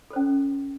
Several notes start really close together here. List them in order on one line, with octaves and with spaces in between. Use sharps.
A4 C5 C#4